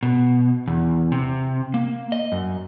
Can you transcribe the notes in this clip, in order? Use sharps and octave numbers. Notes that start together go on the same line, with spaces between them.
B2
E2
C3
A#3
D#5
F#2